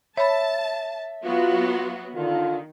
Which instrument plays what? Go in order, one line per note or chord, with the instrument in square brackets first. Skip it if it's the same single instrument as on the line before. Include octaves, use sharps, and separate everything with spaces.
[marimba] C#5 B5 [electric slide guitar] E5 [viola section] A5
[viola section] F#3 B3 F#4 [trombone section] F4
[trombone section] D3 F4 [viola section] D#3